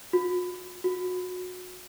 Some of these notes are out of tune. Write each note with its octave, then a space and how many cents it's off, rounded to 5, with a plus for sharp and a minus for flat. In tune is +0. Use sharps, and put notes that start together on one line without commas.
F#4 -45
F#4 -25